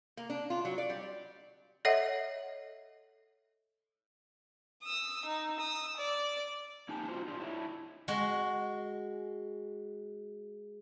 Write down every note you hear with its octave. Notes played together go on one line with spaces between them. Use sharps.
A#3
D4
F4
F#3
D5
G3
A4 C#5 D#5 E5 F#5
D#6 E6
D#4
D#6 E6
D5
A#3 D#4 G4 G#5 A5
D#4 F4 F#4 C5
D4 F4 G4
D4 E4 C#5 E5
G#3 F#4